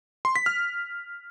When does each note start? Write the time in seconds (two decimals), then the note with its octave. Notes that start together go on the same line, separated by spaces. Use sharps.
0.25 C6
0.36 B6
0.46 F6